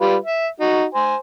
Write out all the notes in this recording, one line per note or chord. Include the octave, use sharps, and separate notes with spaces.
G3 F4 B4
E5
D#4 F#4
C5 G#5